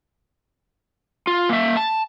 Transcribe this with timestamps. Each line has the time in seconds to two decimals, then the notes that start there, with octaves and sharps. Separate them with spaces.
1.27 F4
1.49 A#3 E5
1.77 A5